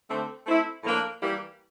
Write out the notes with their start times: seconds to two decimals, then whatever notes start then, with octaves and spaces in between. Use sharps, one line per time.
0.09 D3 A3 C4
0.46 A3 C4 E4
0.84 A2 F3 A#3 D4
1.22 E3 G3 A#3 E4 G4